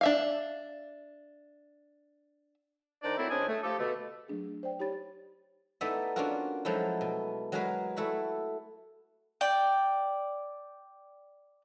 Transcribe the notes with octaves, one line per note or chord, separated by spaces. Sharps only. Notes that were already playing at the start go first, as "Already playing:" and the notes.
D4 E5 F5
D#3 D4 D#4 C5 D5
F#3 A3 C4 E4
C#2 C#4 D4 C5 D#5 G#5
A3
F3 G4 A4
B2 D3 A3
F#3 A3 D4 G#4
C5 D5 G5
D#4 G4 C#5 B5 A6
A3 B3 D#4 E4 D5 E5
A#3 C#4 D4 F4 F#4 A#4
F3 F#3 G#3 A3 D#4 E4
B2
F#3 G#3 F#4 G#4 A#4 B4
A3 E4 F#4 B5
D5 G5